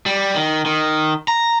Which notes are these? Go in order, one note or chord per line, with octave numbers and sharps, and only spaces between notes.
G3
D#3
D#3
A#5